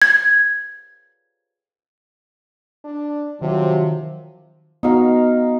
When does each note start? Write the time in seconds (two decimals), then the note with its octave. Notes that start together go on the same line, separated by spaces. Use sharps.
0.02 G#6
2.85 D4
3.41 C3 D#3 F3 F#3
4.83 B3 D#4 F#4 F5